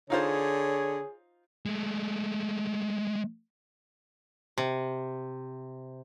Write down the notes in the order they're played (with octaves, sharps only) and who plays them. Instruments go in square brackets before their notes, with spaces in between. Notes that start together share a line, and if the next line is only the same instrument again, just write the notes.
[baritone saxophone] D3 [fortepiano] D#4 F4 C5 [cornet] G#4 [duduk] C#5
[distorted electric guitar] G#3 A3
[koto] C3